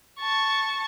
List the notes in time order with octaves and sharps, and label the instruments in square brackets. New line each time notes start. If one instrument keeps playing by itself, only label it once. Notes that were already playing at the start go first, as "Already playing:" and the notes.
[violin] A5 C#6